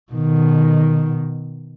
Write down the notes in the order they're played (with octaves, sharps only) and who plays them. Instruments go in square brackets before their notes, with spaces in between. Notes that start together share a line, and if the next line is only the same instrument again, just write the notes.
[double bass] B2 D#3